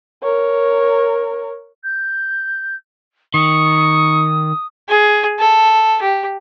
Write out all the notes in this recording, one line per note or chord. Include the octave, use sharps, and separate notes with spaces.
A#4 C#5
G6
D#3 C#6 D#6
G#4
A4
G4